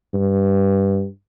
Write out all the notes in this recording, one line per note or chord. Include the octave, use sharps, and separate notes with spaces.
G2